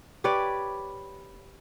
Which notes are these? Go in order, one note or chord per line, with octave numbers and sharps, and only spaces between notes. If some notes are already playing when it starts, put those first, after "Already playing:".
G4 B4 C#5 D5